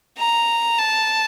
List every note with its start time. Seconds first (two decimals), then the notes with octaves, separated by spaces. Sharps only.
0.18 A#5
0.79 A5